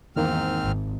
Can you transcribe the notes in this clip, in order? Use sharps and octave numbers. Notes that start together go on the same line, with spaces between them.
E2 G#2 D#3 A#3 C4 F6
G#1